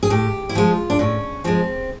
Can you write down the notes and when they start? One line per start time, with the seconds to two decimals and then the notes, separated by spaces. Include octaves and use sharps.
0.03 G#4
0.10 A2 G4
0.49 E4
0.55 F3 G#3 F4
0.90 D4
0.99 A2 C#4
1.44 F3 G#3 C4